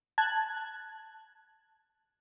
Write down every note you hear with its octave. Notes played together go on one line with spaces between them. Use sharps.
A5 F#6 G#6